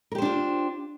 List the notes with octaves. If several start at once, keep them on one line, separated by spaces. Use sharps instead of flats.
D4 F4 G4 A#4 C5